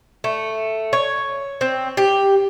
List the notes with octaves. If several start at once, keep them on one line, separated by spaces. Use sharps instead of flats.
A3
C#5
C4
G4